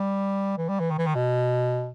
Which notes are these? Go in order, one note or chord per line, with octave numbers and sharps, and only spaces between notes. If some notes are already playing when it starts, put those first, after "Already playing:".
Already playing: G3
E3
G3
E3
D#3
E3
D#3
B2